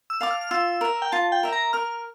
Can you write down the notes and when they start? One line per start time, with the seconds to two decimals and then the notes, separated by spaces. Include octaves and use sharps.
0.10 E6
0.21 F5 A5 D6
0.31 F6
0.41 F6
0.51 F4 E6
0.81 A#4 E5
1.02 G5
1.12 F4 A5
1.32 G5
1.43 A#4 E5
1.53 A#5
1.73 A#4 F6